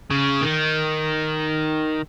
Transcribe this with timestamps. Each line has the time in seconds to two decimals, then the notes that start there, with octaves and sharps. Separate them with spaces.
0.10 C#3
0.42 D#3